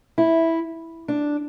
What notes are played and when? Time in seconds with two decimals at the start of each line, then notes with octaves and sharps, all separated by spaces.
0.18 E4
1.08 D4